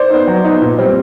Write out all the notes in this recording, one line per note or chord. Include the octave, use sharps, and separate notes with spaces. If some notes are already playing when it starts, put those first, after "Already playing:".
Already playing: C5 D5
B3 D#4
F#3
B3 D#4
A#2
G3 C4